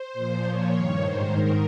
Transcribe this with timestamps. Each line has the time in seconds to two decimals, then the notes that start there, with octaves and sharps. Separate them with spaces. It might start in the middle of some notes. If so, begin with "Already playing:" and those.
Already playing: C5
0.13 A#2 F3
0.43 A#2 F3 C#5
0.73 G2 D#3
1.02 G#2 D#3 C5
1.32 G#2 D#3 A#4